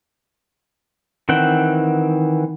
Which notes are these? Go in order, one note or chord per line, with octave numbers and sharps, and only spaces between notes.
D#3 E3 C4 F#5 G5